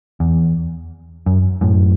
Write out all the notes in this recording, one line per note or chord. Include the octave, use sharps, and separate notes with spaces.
E2
F#2
F#2 A2